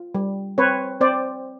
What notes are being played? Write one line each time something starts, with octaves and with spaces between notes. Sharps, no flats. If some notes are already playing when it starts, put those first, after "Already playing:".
Already playing: F4
G3
C4 B4 C#5
C4 C5 D5